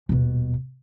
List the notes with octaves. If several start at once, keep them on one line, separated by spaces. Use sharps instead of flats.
D#1 B2